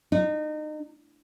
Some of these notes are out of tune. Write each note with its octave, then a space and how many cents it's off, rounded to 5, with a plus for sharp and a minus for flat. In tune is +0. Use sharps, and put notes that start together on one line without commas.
D#4 -30